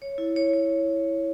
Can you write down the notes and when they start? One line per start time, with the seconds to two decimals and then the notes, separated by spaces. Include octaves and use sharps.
0.02 C#5
0.18 E4
0.36 C#5
0.53 C#5